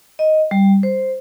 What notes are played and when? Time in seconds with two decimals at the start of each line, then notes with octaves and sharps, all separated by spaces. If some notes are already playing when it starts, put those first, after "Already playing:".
0.19 D#5
0.51 G3
0.83 C5